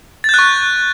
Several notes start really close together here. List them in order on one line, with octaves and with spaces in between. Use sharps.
A6 G6 F#6 C#6